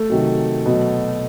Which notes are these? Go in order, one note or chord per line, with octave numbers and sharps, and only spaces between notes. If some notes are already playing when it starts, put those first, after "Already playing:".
Already playing: A3
C3 D#3 F#3
B2 F#3